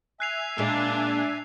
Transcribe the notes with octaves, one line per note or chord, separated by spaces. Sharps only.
E5 G#5 F#6 C7 F7
A#2 G#3 D4